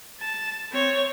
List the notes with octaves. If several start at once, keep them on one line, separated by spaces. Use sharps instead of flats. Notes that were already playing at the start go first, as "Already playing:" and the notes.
A5
C4 C#5